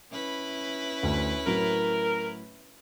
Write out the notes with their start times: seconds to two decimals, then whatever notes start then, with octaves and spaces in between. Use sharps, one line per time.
0.11 C#4 E4 B4
1.03 D2
1.47 A2 F#3 A#4